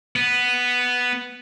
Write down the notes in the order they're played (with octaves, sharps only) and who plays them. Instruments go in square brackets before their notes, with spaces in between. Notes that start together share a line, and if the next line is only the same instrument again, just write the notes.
[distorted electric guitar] B3